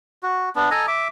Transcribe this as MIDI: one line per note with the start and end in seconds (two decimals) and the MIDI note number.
0.23 0.49 66
0.56 0.69 59
0.56 0.69 62
0.71 0.86 69
0.71 0.86 75
0.71 0.86 80
0.71 0.86 82
0.88 1.08 76
0.88 1.08 86